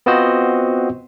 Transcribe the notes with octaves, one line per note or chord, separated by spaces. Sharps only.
B3 C4 F4 F#4 C5 D#5